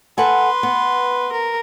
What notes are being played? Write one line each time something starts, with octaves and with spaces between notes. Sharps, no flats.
A4 B4 F#5 G#5 C6
B3
A#4